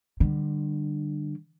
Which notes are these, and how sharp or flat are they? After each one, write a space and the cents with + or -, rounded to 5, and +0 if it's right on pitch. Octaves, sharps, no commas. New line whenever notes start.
D3 +30 G3 +5